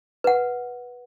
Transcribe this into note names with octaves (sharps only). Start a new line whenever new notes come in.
B4 F#5